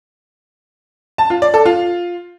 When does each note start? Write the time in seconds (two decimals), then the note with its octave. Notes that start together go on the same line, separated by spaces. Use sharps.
1.18 A5
1.30 F4
1.42 D5
1.54 A4
1.66 F4